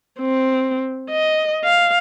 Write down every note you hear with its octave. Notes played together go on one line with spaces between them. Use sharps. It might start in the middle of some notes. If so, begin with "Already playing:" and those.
C4
D#5
F5